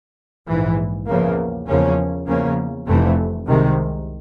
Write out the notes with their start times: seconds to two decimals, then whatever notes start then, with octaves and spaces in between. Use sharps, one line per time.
0.48 A#1 G#2 E3
1.07 E2 C#3 F3 A#3
1.67 E2 C#3 F3 A#3 C#4
2.27 E2 C#3 F3 A#3 C#4
2.87 F1 F2 C3 E3 A3
3.46 C2 C3 D#3 G#3